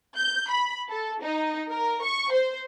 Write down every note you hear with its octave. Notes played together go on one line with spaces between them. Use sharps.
G6
B5
A4
D#4
A#4
C#6
C5